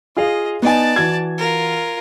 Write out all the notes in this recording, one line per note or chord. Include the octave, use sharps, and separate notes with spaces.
F4 G#4 D#5 F5
B3 D#4 D5 G#5 A5
E3 F#4 G#6
F4 A#4